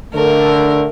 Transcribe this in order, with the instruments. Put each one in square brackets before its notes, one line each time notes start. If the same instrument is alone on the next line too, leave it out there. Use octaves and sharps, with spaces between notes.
[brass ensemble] D3 A3 [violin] A#4